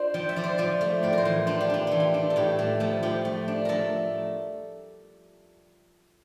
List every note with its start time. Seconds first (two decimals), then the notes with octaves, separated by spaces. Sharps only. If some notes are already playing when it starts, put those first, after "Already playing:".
Already playing: D4 F4 C5
0.14 F3 G5
0.29 E5
0.36 F3 D5
0.44 C5
0.58 F3 D5
0.81 A3
1.03 A2 D5
1.13 A#4 C5
1.25 E3
1.47 D4 F4
1.61 G4
1.70 D4 F4
1.87 E3 G4
2.00 F4
2.14 D4
2.30 A4
2.36 A2 G4
2.59 A3
2.80 F3 A4
3.03 F3 G4
3.25 A3
3.48 D4
3.65 A3 A4 A#4